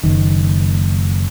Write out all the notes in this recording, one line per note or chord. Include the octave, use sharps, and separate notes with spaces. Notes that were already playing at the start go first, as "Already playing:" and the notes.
F#1 D#3